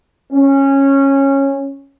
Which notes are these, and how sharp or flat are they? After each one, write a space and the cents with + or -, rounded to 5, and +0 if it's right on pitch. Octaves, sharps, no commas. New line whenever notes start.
C#4 -15